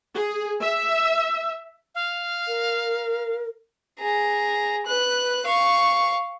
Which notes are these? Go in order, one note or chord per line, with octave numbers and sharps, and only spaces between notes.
G#4
E5
F5
A#4
G#4 A#5
B4 F#6
F5 C#6